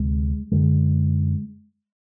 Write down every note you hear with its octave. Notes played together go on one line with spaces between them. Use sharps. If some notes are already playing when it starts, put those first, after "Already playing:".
Already playing: D2 C3 G#3
F#2 D3 G#3